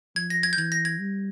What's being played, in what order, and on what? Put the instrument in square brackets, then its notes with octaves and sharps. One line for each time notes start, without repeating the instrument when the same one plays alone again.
[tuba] F3 [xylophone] G#6
[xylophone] A#6
G#6
G6
[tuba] E3 [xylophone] G#6
[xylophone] A#6
G#6
[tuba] G3